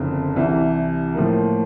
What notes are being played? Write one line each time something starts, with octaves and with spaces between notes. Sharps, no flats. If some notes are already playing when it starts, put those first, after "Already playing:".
Already playing: F#1 F2 D3
C2 C3 E3
A2 F3 A#3